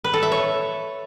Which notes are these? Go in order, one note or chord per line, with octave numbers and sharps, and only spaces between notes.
B4
A4
E5
C#5